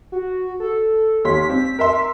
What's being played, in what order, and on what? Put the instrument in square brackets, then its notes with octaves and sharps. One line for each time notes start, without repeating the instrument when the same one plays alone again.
[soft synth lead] F#4
A4
[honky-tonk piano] D#2 C#5 C6 [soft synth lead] B6
[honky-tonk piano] C4
A#4 E5 C6